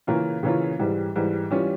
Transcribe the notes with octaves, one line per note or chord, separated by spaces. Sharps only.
C#3 E3 A#3 C#4 F4
C#3 E3 A#3 C#4 F4
G#2 E3 G3
G#2 E3 G3
E3 G3 C#4 F4